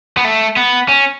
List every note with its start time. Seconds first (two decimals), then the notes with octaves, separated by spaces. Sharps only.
0.17 B3
0.24 A3
0.57 B3
0.89 C#4